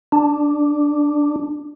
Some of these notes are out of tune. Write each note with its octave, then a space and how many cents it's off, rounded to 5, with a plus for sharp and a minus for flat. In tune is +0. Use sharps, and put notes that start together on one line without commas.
D4 +5